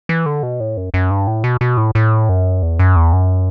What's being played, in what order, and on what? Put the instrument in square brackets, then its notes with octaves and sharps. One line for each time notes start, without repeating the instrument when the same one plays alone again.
[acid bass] E3
D3
B2
A2
F#2
F#2
G2
A2
B2
B2
A2
A2
F#2
E2
F#2
E2
F#2